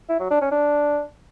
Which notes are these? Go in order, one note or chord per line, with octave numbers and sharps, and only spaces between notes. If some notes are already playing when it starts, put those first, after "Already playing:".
E4
F#3
D4
C#4
D4